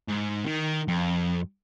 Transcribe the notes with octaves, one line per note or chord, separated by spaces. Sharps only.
G#2
D#3
F2